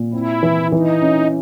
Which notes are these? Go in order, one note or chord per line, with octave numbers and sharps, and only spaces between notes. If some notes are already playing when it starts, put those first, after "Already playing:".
Already playing: A#2
C4 E4
E3
E3 D#4
C#4